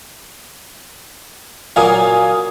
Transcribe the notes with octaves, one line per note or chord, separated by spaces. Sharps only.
A#2 F#3 A#3 F5 G#5 D#6